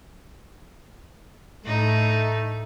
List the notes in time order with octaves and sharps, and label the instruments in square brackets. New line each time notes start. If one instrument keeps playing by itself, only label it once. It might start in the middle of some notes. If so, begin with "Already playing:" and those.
[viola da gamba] A2 D#4 [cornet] A3